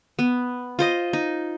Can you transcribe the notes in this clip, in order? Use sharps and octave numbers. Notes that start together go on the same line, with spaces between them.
B3
F4 C5 D#5
D#4